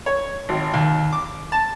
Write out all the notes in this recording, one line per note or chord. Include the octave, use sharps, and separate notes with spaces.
C#5
G#1
D#2
D6
A5